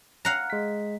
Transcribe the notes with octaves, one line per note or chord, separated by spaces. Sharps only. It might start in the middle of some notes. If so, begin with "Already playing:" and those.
F5 F#5 A#5
G#3 B6